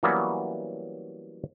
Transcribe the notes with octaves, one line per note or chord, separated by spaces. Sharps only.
E3 F#3 G3 A#3 B3 C#4